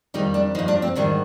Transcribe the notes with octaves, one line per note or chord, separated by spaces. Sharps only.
F2 D#3 G3 D#4
D4
G2 F3 D#4
D4
C4
G#2 D#3 G3 D4